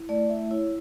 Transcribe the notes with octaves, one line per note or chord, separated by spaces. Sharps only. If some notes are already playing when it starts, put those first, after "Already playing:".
Already playing: E4
A3 D5
E4 E5
E4 C#5